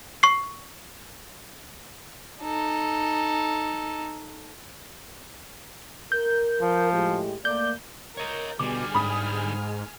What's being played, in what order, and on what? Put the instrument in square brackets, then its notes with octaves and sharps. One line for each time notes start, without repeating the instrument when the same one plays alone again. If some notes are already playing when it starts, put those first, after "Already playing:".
[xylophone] C#6 C7
[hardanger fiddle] D#4 A4
[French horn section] A#4 [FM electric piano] G6
[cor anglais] F3
[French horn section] A2 G#3 G4
[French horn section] A3 A#3 [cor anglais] D5 [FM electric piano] G6
[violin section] A#4 G6 [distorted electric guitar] C#5 D#5
[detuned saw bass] B2 [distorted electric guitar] D3 G3 [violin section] G#4 G#5 F6 [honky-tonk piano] D6
[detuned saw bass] G#2 [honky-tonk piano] B5 D#6